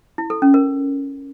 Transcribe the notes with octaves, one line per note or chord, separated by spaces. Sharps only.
E4
A4
C#4
A#4